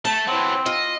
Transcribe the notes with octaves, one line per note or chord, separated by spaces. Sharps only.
A3 A5
E3 F#3 C4
F4 D#5